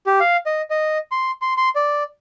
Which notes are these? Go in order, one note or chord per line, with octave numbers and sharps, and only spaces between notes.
G4
F5
D#5
D#5
C6
C6
C6
D5